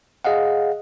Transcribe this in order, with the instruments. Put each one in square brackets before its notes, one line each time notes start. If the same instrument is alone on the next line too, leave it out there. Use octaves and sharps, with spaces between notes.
[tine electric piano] G#4 D#5 F5 F#5